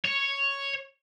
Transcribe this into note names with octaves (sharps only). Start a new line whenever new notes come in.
C#5